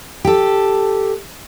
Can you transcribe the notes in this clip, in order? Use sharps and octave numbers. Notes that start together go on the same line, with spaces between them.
G4 A4